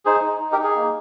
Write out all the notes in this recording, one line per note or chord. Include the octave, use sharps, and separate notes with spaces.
D#4 G#4 C5
D#4
D#4
G4 A#4
D#4 G#4
A#3